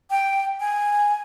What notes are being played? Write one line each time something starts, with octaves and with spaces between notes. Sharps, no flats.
G5
G#5